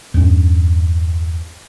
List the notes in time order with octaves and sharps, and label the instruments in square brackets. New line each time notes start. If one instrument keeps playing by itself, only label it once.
[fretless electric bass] E2 G2 C#4